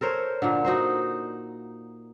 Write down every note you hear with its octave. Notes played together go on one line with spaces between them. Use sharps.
A4 A#4 C5 C#5
A#2 D3
D#4 F#4 C5